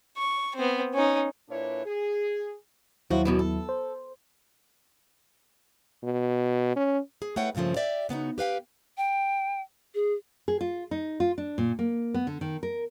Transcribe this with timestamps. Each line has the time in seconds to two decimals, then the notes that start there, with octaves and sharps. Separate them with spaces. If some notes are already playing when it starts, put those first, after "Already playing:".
0.17 C#6
0.56 B3 C4
0.93 C#4 D#4
1.49 A#2 D4 E4 B4 C#5
1.86 G#4
3.10 D#2 F3 F#3 E4 F#4
3.25 F#2 B2 E3
3.39 A4
3.69 C5
6.03 B2
6.76 C#4
7.22 G#4
7.36 A3 E4 B4 C#5 F#5 G5
7.55 G2 A#2 C#3 F3 A3
7.76 G4 D5 E5 G5
8.09 C#3 B3 D#4 F#4
8.38 G4 B4 F5 G5
8.97 G5
9.95 G#4
10.48 G#4
10.61 F4
10.91 D#4
11.20 F4
11.38 D4
11.58 A#2
11.79 A#3
12.14 B3
12.27 D3
12.41 D#3
12.63 A#4